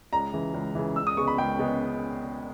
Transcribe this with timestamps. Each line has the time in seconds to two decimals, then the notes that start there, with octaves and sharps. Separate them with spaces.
0.13 C#2 A#5
0.33 C#3 E3
0.54 C#2
0.75 C#3 E3
0.96 C#2 E6
1.07 D#6
1.17 C#3 G#3 B3 C#6
1.27 B5
1.38 C#2 G5
1.58 C#3 G#3 B3